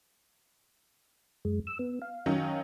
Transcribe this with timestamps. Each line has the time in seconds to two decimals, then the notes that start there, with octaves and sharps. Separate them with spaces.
1.45 F#2 G#3
1.67 E6
1.79 B3
2.02 F5
2.26 D#3 F#3 C#4